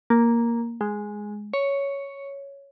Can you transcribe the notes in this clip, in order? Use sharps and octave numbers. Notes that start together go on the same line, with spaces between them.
A#3
G#3
C#5